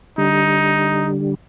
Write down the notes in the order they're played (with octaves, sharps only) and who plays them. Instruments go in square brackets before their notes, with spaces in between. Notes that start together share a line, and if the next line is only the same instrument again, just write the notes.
[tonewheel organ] D3 G3 [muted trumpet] D#4